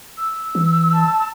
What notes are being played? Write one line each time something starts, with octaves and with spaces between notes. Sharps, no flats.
E6
E3
A5